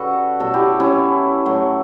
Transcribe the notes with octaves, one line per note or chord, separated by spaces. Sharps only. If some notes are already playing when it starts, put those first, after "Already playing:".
Already playing: C#3 G3 F#4 A4 B4
B2 F#3 A3 F#4 A4
E4 G4
C#4 E4
A2 F#3 A3